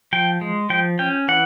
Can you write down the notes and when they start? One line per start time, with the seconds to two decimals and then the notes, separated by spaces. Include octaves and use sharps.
0.13 F3 G5
0.41 G#3
0.70 F3 G5
0.99 C#4 G5
1.28 E3 F#5